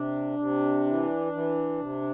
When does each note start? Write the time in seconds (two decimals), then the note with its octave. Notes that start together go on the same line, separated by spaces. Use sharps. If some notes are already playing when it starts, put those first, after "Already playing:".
Already playing: C3 D4
0.39 C3
0.86 E3
1.33 E3
1.79 C3